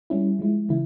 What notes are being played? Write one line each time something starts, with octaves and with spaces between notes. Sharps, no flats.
G3 C#4 E4
F3 G#3 E4
C#3 E3 E4